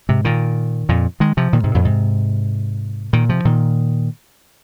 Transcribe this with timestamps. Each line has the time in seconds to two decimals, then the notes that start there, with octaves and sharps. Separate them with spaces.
0.09 G#2 C3
0.25 A#2 D#3
0.89 F2 A#2
1.20 D#3 G#3
1.37 C3 F3
1.53 A#2 D#3
1.64 G#2 C3
1.74 F2 A#2
1.85 G#2 C3
3.13 A#2 D#3
3.29 C3 F3
3.45 A#2 D#3